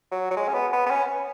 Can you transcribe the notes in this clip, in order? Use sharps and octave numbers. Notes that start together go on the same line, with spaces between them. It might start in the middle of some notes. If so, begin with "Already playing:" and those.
F#3
F#3
G#3
C#4
B3
B3
B3
C#4